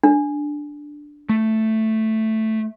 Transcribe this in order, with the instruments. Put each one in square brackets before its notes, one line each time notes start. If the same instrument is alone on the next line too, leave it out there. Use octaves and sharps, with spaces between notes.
[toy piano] D4
[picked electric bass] A3